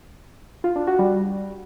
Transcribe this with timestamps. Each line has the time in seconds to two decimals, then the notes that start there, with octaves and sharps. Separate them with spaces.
0.64 F4
0.76 D4
0.87 F#4
0.99 G3